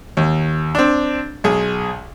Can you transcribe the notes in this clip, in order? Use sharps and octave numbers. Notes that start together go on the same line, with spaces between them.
D#2
C4 D4
B1 G#4